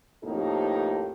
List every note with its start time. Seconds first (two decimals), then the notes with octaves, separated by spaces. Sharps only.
0.24 F2 A2 A#3 D#4 G4 A4